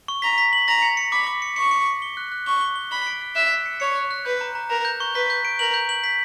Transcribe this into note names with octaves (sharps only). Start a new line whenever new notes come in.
C#6
A#5 B6
B6
F#7
A#5 A#6
C#7
C#7
B5 D6
D6
C#7
C#6 C#7
C#7
C#7
G7
F#6
F#6
C#6 G7
G7
G7
B5 G7
D7
B6
E5 F#6
F#6
C#7
C#5 C#7
F#6
F#6
B4 G6
A#5
A#5
A#4 A#5
G6
C#6
B4 B6
G6
D7
A#4 F#7
G6
F#7
B6